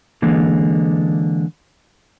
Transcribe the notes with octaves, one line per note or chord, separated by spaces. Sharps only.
D3 E3 G#3 A#3